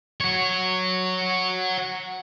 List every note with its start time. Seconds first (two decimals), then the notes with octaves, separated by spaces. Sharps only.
0.20 F#4 C#5